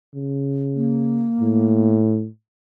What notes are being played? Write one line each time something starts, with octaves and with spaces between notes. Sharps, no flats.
C#3
A#3
A2